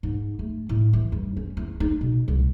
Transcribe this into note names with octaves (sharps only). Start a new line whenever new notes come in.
G#2
A3
A2
E3
G2
C#4
E2
D#4
B2
C2